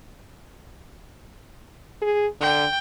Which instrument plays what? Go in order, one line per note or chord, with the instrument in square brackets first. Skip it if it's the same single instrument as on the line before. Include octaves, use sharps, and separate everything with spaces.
[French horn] G#4
[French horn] D3 [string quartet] G5